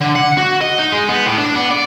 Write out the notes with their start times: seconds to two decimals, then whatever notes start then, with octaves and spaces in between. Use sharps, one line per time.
0.01 D3
0.15 F#5
0.37 F#4
0.61 D#5
0.79 D#4
0.92 G#3
1.09 B3
1.25 A2
1.38 D4
1.55 B3
1.71 D5